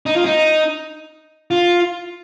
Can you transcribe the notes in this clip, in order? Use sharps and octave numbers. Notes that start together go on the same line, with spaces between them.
D#4
F4
D#4
F4